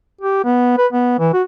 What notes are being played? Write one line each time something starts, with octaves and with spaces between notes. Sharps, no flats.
G4
B3
B4
B3
E3
F#4